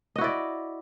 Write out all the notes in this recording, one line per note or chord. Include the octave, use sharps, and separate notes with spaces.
E4 F#4 D5 D#5